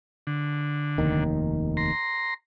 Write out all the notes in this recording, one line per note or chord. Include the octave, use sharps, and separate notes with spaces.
D3
F1 D#2 D#3
A#5 C6